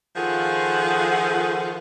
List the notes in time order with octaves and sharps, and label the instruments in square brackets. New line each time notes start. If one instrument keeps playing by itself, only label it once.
[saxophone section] D#3 F3 F4 G#4 A4 F#5